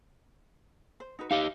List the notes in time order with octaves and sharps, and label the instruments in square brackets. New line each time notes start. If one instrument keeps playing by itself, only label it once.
[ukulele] C5
D#4 F#4 B4
[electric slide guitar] D#4 G4 D#5 [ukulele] F5